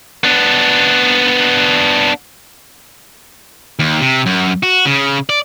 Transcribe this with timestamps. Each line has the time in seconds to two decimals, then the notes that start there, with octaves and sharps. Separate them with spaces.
0.24 B3 D4
3.79 D#2
4.01 C3
4.26 F#2
4.63 F#4
4.85 C#3
5.29 D5